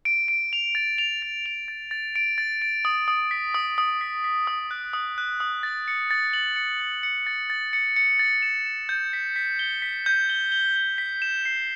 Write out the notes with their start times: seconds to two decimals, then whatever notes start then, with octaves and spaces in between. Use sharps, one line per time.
0.05 D7
0.28 D7
0.53 F7
0.75 A6
0.98 F7
1.22 A6
1.46 F7
1.68 A6
1.91 A6
2.16 D7
2.38 A6
2.62 D7
2.85 D#6
3.08 D#6
3.31 B6
3.55 D#6
3.78 D#6
4.01 B6
4.24 B6
4.47 D#6
4.71 F#6
4.93 D#6
5.18 F#6
5.40 D#6
5.63 A6
5.88 C#7
6.11 A6
6.33 F#7
6.56 C#7
6.80 A6
7.03 C#7
7.27 A6
7.50 A6
7.73 C#7
7.96 C#7
8.19 A6
8.42 E7
8.66 E7
8.89 G6
9.13 B6
9.36 B6
9.59 G7
9.82 B6
10.06 G6
10.30 G7
10.52 G7
10.76 G7
10.98 B6
11.22 E7
11.45 C7